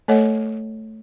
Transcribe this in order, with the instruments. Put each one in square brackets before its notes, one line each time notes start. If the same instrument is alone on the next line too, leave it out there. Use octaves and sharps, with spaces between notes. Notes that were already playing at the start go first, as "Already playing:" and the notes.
[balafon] A3 A4 C#5 D#5 F#5